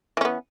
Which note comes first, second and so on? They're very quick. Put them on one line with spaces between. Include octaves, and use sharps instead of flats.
E3 C#4 B3